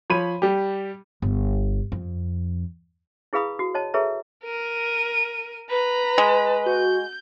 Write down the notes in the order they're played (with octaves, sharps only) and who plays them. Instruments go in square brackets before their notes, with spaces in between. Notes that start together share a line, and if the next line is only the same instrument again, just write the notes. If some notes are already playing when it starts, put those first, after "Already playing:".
[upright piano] F3 C#5 B5 D#7
G3 G4
[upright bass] G1
F2
[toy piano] E4 G#4 B4 F5 B5 D#6
F#4
C#5 D#5 A5
G#4 A4 B4 C#5 E5 A#5
[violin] A#4 D#7
[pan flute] B4 [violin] A#5 B5
[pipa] G#3
[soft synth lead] F#4 [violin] G6